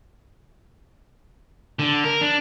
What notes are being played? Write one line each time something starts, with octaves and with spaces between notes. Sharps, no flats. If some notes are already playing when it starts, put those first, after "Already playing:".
D3
A#4
D4